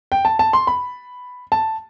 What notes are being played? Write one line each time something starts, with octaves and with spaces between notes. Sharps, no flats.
G5
A5
A5
C6
B5
A5